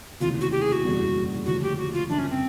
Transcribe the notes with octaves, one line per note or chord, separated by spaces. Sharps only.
F1 D#2 C#3 E3 F4
F#4
G4
G#4
F#4
F#1 E2 B2 G3
E1 D2 C#3 F3 F#4
G4
F#4
F4
G1 F#2 C#3 D4
C#4
C4